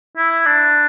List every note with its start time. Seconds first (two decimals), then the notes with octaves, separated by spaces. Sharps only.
0.17 E4
0.46 D4